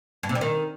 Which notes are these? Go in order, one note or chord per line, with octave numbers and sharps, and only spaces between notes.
G2
C3
G3
D#3